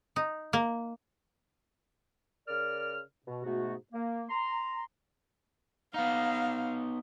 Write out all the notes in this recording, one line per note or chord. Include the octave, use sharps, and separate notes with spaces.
D#4
A#3
C#3 A#4 D5 F6
B2
G#2 B2 A3 B3 F#4
A#3
A#5 C6
B3 D#4 F5